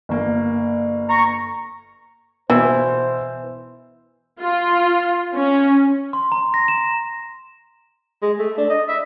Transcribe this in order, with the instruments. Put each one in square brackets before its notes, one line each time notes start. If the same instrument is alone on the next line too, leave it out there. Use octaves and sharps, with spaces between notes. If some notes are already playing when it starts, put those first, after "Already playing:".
[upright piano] G1 A#3
[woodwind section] A#5 C#6
[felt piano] B2 E6 [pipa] E3 [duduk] C5
[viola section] F4
C#4
[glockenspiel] C6
A#5
A#6
E7
[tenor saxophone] G#3
A3
D4
D#5
E5